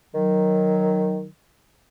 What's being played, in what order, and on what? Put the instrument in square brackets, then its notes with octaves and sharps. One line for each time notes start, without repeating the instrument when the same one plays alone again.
[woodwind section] D#3 F#3